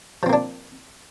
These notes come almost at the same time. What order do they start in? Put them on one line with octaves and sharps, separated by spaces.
F3 C4 A#3 D4